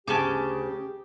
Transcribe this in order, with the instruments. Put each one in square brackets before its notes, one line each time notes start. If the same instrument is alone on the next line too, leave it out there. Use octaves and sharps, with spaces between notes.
[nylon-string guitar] D2 C#3 [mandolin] C#4 A5 D6 [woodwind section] G4 [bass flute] G#4